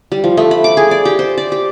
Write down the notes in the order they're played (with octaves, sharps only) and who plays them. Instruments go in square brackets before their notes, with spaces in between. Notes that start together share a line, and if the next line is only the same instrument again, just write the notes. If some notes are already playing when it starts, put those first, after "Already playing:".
[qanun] G3
F3
A3
B5
D6
G#4
D5
G4
C5
D5
G4